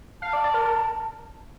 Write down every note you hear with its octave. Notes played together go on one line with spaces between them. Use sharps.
F5 A5
D5
D5
A#4
A#4